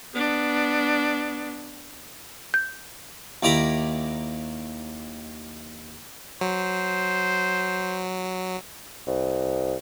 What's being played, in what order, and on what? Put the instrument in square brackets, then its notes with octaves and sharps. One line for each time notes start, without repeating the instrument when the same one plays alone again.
[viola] B3 D4
[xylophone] G6
[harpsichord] D#2 E4 D5 A#5 B5
[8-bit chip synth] F#3 [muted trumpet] C5
[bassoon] C2